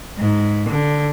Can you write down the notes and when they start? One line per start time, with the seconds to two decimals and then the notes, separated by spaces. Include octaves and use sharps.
0.18 G#2
0.70 D3